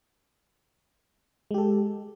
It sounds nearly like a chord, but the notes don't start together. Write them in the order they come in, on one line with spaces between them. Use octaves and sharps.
G#3 G4 A4